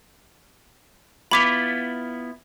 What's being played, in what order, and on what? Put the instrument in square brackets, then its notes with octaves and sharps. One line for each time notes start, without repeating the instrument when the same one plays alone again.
[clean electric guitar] B3 E4 F4 [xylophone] B5 D6 F7